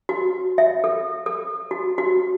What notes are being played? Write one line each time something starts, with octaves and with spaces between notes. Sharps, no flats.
F#4
E5
A4
A4
F#4
F#4